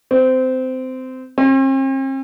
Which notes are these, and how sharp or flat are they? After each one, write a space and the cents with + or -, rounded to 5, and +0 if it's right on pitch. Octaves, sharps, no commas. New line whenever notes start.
C4 -20
C4 +45